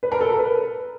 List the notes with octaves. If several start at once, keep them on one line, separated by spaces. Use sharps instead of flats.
B4
A#4
A4
A#4
B4